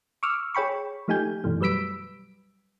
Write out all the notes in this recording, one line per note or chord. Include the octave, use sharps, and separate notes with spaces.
C#6 D6 E6 F6
G#4 C#5 G5 B5 C#6
F3 A3 D#4 G4 G#5 G6
F#2 B2 E3 A3
F#3 G3 B4 E6 B6 D7